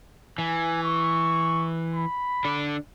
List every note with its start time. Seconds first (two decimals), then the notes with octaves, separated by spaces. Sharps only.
0.38 E3 G#5
0.83 C#6
1.94 B5
2.45 D3 D4